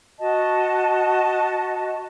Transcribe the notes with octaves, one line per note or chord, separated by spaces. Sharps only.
F#4 D#5 A5